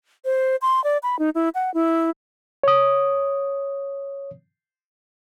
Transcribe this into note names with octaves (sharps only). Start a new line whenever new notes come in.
C5
C6
D5
B5
D#4
E4
F#5
E4
C#5 D#6